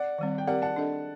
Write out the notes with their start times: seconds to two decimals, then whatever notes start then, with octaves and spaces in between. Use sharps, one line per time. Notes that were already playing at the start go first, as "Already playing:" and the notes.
Already playing: D5 F#5
0.18 D#3 G3 C4
0.38 G5
0.47 C4 G4 A#4 D5 F#5
0.62 F#5 A5
0.76 D4 A4 D#5